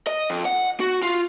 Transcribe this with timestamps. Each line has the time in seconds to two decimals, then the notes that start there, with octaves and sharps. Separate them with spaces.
0.07 D#5
0.30 F2
0.45 F#5
0.80 F#4
1.03 F4